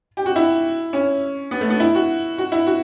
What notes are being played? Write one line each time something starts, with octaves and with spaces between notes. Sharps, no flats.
G4
F#4
E4
C#4
B3
A3
B3
E4
F#4
F#4
E4
F#4